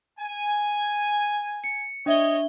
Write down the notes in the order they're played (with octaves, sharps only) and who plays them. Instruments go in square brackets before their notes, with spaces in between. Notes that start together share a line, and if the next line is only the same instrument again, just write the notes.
[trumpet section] G#5
[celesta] C#7
[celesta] D4 E5 G7 [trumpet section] C#5 D#5